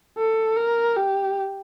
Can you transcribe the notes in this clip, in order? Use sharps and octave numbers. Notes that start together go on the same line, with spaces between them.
A4
A#4
G4